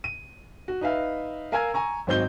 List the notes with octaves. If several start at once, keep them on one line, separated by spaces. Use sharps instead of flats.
D#7
F#4
D#4 B4 E5 F5
A#4 F5 G#5 A#5 E6 G#6
G#5 A#5 C#6
G#1 F#3 C4 D#4 G6 G7